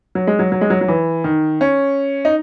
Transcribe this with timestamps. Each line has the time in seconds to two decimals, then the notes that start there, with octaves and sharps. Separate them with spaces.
0.15 F#3
0.27 G#3
0.39 F#3
0.52 F#3
0.61 G#3
0.70 F#3
0.81 F#3
0.88 E3
1.24 D#3
1.61 C#4
2.25 D#4